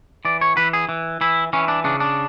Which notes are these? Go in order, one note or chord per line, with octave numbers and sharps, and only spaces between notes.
E3 D5
C#5
E3 B4
G#4
E3
E3 E4
E3 C#4
D4
C#3 D4
D4